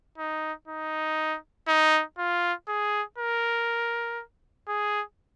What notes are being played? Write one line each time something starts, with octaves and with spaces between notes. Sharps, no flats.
D#4
D#4
D#4
F4
G#4
A#4
G#4